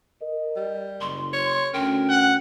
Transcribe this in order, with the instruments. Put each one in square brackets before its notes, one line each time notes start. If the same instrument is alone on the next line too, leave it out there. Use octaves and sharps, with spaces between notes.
[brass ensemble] A#4 D#5
[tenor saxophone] G3
[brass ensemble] F#1 [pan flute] C6
[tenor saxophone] C#5
[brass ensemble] D2 C#4 [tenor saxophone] A#4 [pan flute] G5
[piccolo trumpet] F#5